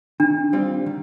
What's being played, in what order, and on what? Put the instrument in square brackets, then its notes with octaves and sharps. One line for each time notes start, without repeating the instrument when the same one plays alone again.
[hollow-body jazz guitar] D#3 [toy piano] D4
[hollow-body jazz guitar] G3 C4 F4
D#3